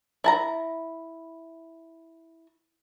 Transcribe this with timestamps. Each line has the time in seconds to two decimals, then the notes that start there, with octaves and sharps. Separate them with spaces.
0.24 E4 A5 A#5